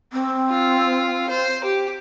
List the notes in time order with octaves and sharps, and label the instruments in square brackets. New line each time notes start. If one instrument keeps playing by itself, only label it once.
[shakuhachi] C4
[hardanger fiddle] F4
C5
G4